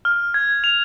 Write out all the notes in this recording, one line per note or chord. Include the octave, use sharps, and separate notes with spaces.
F6
G#6
F7